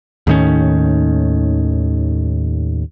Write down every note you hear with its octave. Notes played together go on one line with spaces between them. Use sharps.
D#2 A2 D#3 C#4